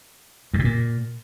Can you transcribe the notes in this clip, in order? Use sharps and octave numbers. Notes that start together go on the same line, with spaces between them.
G2
C3
A#2